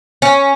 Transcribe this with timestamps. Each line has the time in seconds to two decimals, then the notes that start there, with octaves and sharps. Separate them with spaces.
0.22 C#4